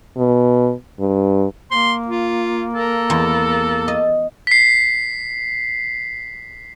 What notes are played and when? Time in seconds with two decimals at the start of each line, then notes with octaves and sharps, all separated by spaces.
0.17 B2
1.00 G2
1.71 A#3 C6
2.08 F4
2.75 A4 A#4
3.10 E2
3.88 D#5
4.47 B6 C7